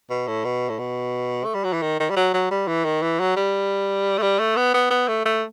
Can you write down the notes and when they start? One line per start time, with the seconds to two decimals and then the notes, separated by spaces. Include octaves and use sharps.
0.10 B2
0.28 A2
0.45 B2
0.69 A2
0.79 B2
1.45 A3
1.55 G3
1.64 F#3
1.73 E3
1.82 D#3
2.00 D#3
2.10 G3
2.16 F#3
2.34 F#3
2.51 G3
2.67 E3
2.85 D#3
3.03 E3
3.20 F#3
3.36 G3
4.18 A3
4.23 G3
4.39 A3
4.56 B3
4.74 B3
4.91 B3
5.08 A3
5.25 A3